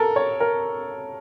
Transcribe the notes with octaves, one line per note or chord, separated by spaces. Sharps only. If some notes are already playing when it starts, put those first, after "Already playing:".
Already playing: A4 A#4
C#5
A#4